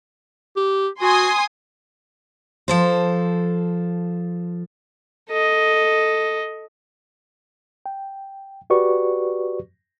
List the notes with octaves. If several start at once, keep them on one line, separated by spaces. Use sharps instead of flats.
G4
F#4 G#5 C6 D#6
F3 A4 C5
A4 D#5
G5
F#4 G4 B4 D5 C#6